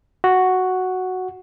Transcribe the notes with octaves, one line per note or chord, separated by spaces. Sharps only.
F#4